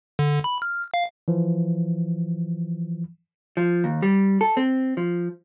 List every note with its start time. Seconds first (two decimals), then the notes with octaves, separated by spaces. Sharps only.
0.19 D3
0.44 B5
0.62 F6
0.94 F5
1.28 E3 F3
3.57 F3
3.84 D#2
4.02 G3
4.41 A4
4.57 C4
4.97 F3